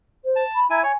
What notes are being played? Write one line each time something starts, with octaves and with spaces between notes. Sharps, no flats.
C5
A5
B5
E4 G#5 A#5
C#5 G#5